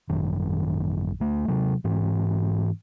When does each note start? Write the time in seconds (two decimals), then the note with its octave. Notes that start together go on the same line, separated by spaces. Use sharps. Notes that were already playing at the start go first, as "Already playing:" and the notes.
0.09 G#1 F#2 D#3
1.20 D2 A3
1.48 C3 F#3
1.84 G#2 E3 C4